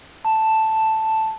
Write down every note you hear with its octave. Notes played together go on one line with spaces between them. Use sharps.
A5